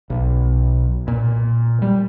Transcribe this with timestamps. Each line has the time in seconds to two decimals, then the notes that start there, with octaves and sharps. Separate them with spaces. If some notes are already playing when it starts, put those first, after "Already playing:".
0.10 B1
1.08 A#2
1.82 G3